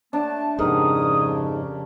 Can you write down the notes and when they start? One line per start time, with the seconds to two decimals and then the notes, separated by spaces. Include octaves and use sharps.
0.13 A3 D4 A5
0.59 F2 G#2 C#3 G4 A#4 D#6